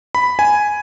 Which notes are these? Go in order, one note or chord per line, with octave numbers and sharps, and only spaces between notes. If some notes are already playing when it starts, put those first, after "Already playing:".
B5
G#5